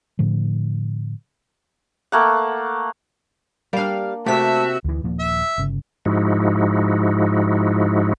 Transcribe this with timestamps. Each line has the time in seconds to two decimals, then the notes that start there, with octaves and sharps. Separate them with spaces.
0.19 A2 D3 F3
2.12 A3 A#3 F#5
3.73 G3 A#3 D4 F5
4.26 C3 A3 F#4 G4 E5 A5 B6
4.84 D2 E3
5.03 D#1 F3 A#3
5.20 E5
5.58 G1 C#3
6.05 G#2 F3 G#3 D#4 E4 F#4